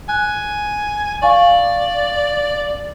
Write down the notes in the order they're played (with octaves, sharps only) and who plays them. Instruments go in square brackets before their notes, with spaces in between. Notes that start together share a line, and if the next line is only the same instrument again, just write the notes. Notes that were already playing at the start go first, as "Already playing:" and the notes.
[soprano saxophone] G#5 [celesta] F#6
[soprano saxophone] D5 [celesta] F5 G#5 C#6